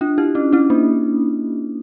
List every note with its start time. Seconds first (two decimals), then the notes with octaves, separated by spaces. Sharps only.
0.01 D4 F4
0.18 E4 G4
0.35 C#4 E4
0.53 C#4 E4
0.70 A#3 D4